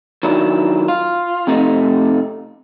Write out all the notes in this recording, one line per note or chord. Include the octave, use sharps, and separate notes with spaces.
D#3 F#3 D4 E4
F4
F2 C3 A3 D4 D#4